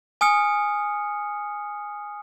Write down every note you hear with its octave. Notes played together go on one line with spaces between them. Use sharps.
G#5 D#6 F6 C#7